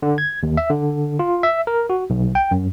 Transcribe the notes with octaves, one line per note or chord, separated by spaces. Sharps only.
D3
G#6
D#2
E5
D3
F4
E5
A#4
F#4
B1
G5
F#2